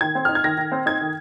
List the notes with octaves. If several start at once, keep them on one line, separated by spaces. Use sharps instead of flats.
D#3 G#6
C4
D#4 F6
G#6
D#3 A#6
D#3
C4
D#4 G#6
D#3